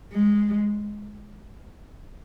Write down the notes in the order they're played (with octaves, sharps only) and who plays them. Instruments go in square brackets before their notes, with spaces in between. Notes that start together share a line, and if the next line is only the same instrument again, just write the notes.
[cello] G#3